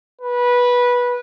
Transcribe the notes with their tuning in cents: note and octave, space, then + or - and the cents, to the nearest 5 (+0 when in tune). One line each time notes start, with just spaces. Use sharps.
B4 -15